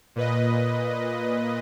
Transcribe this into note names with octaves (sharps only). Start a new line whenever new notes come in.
A#2 B4 D#5